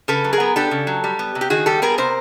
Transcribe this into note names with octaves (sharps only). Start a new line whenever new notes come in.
C#3 A4 B4
F#3
G#4 A#4
B3
D4 G4 A4
C#3
F#3
G3
B3
C3
G4
D#3 F#4 G#4
G3 G4 A4
B3 G#4 A#4
C3 A#4 C5